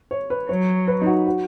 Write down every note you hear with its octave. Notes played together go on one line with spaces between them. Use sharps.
C#5
B4
F#3 C#5
B4
D#4
F#4
F#4